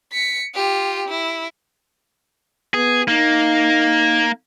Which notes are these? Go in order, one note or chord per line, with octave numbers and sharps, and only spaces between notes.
B6 C#7
F4 G4
E4
B3 G#4
A#3 D#4